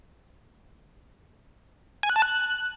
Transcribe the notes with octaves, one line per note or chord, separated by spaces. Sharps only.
G#5
F#6
A5
F#6